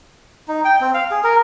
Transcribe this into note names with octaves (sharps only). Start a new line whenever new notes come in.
D#4
G5
C4
F5
G#4
A#4